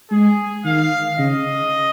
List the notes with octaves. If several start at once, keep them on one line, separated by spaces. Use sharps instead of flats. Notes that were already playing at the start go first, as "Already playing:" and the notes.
G#3 G#4
D#3 F5
C#3 D#5